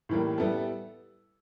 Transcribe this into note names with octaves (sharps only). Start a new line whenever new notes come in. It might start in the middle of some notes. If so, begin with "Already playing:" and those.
A2 E3 G3 A#3
G3 B3 E4 A4